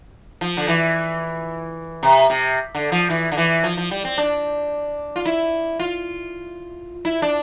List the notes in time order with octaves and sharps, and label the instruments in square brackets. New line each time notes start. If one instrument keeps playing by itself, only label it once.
[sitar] F3
D3
E3
C3
C3
D3
F3
E3
D3
E3
F3
F3
G3
C4
D4
F4
E4
F4
E4
D4